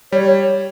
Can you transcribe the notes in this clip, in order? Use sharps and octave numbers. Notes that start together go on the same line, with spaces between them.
G3 C#5